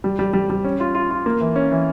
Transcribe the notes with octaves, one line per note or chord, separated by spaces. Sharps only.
G3
G3
G3
G3
C#4
F4
F4
F4
A#3
E3
C#4
E3